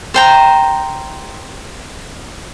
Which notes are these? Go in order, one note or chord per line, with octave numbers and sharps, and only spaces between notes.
C5 G5 A#5